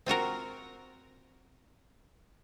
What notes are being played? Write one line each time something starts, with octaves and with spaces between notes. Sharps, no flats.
C4 F4 F#4 A#4